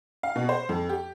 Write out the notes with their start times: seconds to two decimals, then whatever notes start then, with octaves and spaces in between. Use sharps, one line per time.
0.23 F5
0.36 B2
0.49 C5
0.69 F2
0.89 G4